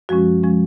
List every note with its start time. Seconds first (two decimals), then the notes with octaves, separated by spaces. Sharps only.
0.09 F#2 F3 G#3 C#4 F#4
0.43 F3 G#3 C#4